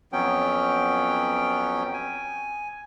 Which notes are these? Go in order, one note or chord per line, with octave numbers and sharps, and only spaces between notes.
F2 F#3 B3 C#4 G5
G#5